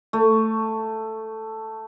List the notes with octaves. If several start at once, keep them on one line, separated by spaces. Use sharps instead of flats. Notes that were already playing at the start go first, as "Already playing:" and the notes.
A3